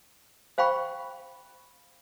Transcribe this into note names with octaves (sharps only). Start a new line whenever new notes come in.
C5 F5 G5 B5 C#6